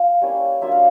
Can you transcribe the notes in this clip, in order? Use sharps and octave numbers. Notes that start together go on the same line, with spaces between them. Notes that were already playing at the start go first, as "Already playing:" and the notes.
Already playing: F4 F5
G3 A#3 C#4 E4
F#3 A#3 D4 F4 E5
F5